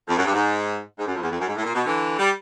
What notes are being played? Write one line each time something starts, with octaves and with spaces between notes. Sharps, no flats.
F2
F#2
G2
G#2
G#2
F#2
F2
E2
F2
F#2
G#2
A2
A#2
B2
D3 E3
G3